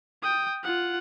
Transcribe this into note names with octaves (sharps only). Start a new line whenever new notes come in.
G5 D#6
F4 F#5